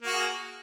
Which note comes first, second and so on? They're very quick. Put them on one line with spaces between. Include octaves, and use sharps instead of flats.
A#3 F#4 G#4